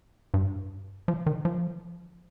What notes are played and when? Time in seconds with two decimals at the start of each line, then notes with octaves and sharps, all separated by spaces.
0.34 G2
1.08 F3
1.26 D#3
1.45 F3